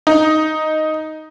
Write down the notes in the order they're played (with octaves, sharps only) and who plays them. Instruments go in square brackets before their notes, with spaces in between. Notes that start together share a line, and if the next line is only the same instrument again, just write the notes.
[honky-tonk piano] D#4